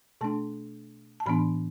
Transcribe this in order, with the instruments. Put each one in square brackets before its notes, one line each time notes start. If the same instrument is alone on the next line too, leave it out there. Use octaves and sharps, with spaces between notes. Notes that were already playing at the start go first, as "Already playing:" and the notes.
[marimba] B2 A3 D4 A5
A5
A2 E3 B3 D4 B5